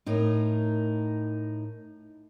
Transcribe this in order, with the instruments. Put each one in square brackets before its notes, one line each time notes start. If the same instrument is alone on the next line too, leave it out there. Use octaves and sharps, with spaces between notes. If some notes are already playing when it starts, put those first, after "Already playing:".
[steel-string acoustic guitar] A2 D#4 A#4